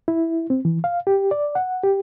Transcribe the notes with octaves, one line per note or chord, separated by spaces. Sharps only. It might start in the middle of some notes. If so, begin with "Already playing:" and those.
E4
C4
E3
F5
G4
D5
F#5
G4